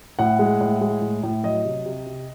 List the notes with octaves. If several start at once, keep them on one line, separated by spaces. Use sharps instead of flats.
A2 F#5
G#3
A2
G#3
A2
A2
F#3 D#5
C3
C3
C3